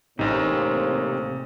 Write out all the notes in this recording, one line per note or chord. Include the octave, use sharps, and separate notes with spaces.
A1 A2 C3 A#3 C4 D#4